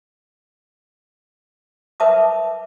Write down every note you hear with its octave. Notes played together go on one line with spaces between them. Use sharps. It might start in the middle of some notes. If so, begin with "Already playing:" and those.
A#4 B4 E5 A5 D6 D#6